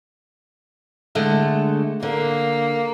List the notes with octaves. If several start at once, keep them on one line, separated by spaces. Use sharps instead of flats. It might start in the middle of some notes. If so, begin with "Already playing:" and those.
D3 G#3 A3
D3 A#3